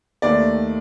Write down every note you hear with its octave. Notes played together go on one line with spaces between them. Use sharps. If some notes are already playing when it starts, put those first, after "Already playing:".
D#2 D#3 A3 D5